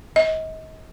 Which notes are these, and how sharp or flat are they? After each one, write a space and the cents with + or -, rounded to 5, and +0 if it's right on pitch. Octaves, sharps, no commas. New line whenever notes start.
D#5 +35